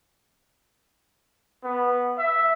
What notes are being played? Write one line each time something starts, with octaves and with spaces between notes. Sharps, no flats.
B3
E5